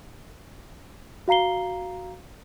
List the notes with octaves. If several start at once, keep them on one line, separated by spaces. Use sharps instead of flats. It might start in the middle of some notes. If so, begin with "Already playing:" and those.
F#4 F5 A#5 C7 G7